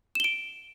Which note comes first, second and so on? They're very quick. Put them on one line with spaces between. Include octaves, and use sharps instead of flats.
E7 G7 D7